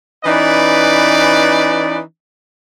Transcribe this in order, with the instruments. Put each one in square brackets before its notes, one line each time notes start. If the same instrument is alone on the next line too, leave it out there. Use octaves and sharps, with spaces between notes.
[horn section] E3 C#4 D#4 B4 D5